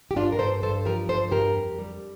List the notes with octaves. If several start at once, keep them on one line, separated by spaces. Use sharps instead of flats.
G4
G2 D4 F4
A#4
G2 A4 C5
G2 A4 C5
F3 G4 A#4
G2 A4 C5
G2 G4 A#4
F2
G3